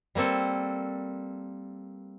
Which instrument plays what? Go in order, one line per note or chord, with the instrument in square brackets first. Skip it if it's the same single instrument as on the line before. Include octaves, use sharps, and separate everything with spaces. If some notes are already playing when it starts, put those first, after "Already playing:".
[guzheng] G3 A#3 C4 A4